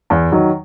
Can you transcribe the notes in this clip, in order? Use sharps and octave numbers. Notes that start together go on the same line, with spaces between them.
E2
D#3 F#3